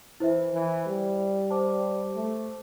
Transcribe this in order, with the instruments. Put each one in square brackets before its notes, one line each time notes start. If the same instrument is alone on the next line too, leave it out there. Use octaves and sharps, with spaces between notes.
[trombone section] E3 [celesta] E4 C5 E5
[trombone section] E3
G3
[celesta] C5 A5 D6
[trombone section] A3